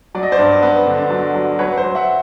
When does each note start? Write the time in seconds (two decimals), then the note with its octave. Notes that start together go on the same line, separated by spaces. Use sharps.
0.15 F#3 D5
0.23 D#5
0.32 C5 D5
0.39 G2
0.63 B3
0.87 D3
1.10 F#3
1.35 F#3
1.59 F#3 B4 C#5
1.77 C5
1.84 F#3
1.95 E5 F#5